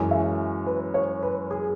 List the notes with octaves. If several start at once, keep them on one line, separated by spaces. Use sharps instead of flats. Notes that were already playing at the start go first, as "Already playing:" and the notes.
Already playing: F#2 E3 G#3 C#4
E5
B4
C#5
B4
G#4